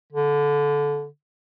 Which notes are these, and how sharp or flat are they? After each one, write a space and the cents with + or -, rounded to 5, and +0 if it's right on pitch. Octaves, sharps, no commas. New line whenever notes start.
D3 -20